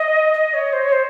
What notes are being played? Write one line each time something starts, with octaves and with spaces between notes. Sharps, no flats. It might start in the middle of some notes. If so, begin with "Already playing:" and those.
Already playing: D#5
D#5
C#5
C5
C#5
C5